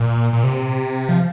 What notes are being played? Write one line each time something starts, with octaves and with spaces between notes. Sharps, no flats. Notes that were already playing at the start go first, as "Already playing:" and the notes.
Already playing: A#2
A#2
C3
F3